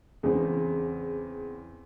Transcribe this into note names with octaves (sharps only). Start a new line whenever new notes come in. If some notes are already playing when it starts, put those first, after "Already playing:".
E2 C#3 C4